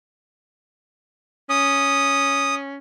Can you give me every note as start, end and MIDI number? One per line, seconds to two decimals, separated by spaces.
1.50 2.78 61
1.50 2.55 87